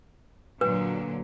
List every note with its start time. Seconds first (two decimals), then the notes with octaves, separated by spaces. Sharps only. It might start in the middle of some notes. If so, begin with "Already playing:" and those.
0.61 A#2 D3 F#3 B4